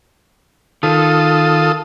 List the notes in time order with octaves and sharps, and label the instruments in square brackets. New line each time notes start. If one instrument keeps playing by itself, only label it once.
[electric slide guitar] D#3 [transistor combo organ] F4 A4 D#6